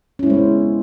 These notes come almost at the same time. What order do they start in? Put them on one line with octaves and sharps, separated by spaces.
C#4 E4 G#3 C5 B3